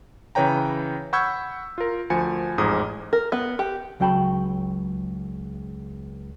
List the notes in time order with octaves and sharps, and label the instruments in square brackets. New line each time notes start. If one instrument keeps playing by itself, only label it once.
[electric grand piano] C#3 E3 B4 C#5 G5 A#5
F#5 B5 C#6 E6 G6 G#6
F4 A#4
D2 F3 G#5 C#7
A1 F2 G#2 G#4 A#5 D#6
[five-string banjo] A#4
B3
G4
[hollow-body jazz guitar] C#2 F#3 F#4 G5 A5 B5